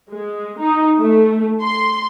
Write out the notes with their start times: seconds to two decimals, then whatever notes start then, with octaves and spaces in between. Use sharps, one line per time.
0.12 G#3
0.61 D#4
0.99 A3
1.62 C6